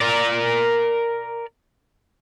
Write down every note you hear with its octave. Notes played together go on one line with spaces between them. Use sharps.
A#4 D5